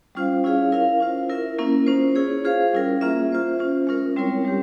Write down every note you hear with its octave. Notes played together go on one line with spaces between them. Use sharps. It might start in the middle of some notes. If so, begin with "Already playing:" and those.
G3 C#4 F4 C5 F5
C#4 E4 G#4 C#5 F5
E4 A#4 F5
C#4 F4 C5
E4 A#4 E5
A#3 C#4 E4 A#4
C#4 F4 C5
E4 G#4 C#5
F4 G#4 C5 F5
G3 C#4 E4 A#4
A#3 C#4 F4 G#4 E5
F4 C5 E5
C#4 F4 C5
G#3 C#4 F4 A#4
G3 C4 E4 A#4 C#5
G3 C#4 G4